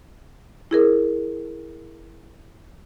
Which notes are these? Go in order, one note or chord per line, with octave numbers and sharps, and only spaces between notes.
E4 G#4 A#4